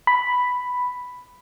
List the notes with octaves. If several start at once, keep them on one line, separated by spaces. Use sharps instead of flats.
B5